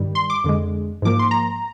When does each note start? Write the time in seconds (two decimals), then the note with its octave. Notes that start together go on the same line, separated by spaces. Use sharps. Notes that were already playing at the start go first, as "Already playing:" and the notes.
Already playing: G2 D#3 G3
0.15 C6
0.30 D6
0.44 F2 D3 G#3
1.02 G#2 F3 A#3 D6
1.19 C6
1.31 A#5